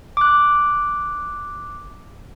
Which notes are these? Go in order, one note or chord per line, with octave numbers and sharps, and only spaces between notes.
D6 F#6